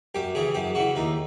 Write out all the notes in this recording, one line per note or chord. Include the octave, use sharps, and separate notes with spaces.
F#2 G4
C#3 E3 G#4
F#2 G4
C#3 E3 F#4
D#2 D#4